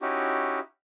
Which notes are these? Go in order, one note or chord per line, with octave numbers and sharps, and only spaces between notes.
C#4 D#4 E4 F#4 G4